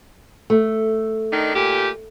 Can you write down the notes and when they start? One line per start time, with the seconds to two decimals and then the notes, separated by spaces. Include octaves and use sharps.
0.50 A3
1.32 D#3 D4 D#4
1.55 A#2 G4